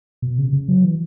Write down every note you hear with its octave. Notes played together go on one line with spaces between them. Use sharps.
B2
C#3
C#3
F#3
E3